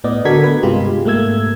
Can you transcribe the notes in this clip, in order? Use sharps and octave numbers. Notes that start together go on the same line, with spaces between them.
A2 B3 D5 D#5
D3 F#4 A4 A#4 G#6 B6
B3 B4
G2 C3 G#3 F4 G4
G#2 A3 A#3 E6 G#6